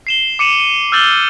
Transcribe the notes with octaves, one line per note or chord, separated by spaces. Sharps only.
C7 E7 G7
D6 C#7 D#7 E7 F#7
D#7
E6 F6 G6 A6 F#7 G7